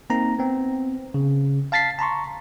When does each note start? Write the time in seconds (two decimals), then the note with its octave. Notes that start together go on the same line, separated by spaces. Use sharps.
0.10 A#3 C4 D#4 A#5
0.39 B3 C4
1.14 C#3
1.72 F5 A5 A6 B6 C7
1.99 A5 A#5 C6 C#6